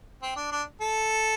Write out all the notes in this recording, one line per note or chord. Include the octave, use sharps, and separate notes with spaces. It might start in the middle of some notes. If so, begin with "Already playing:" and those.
C4
D4
D4
A4